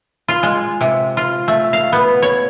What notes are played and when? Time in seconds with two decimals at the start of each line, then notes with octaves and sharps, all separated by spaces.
0.28 F4
0.43 G#3
0.81 C3
1.17 F4
1.48 A3
1.73 F5
1.92 B3
2.22 C#5